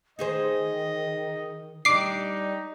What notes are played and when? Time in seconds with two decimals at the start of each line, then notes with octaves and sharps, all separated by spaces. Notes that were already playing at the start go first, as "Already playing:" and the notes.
0.19 D#3 D#4 G#4 C5 D#5
1.85 G3 D4 D#4 D6 C7